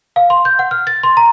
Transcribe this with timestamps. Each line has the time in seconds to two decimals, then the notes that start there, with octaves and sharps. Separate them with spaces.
0.16 F5
0.30 C6
0.45 G6
0.59 F#5
0.71 F6
0.87 A6
1.03 C6
1.17 A#5